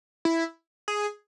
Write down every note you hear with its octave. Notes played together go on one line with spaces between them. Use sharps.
E4
G#4